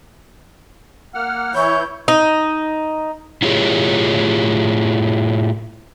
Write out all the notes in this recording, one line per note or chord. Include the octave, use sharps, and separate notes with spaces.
A#3 F#5 F6
E3 E4 C#5 G6
D#4
A2 E4 F4 G4 G#4 C#5